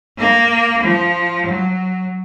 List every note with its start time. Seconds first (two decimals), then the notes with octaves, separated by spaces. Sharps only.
0.18 A#3
0.83 F3
1.47 F#3